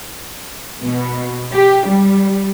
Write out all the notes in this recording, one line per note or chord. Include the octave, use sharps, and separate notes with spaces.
B2
G4
G3